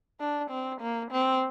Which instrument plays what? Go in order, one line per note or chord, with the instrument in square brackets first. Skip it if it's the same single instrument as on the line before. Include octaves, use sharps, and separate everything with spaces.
[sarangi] D4
C4
A#3
C4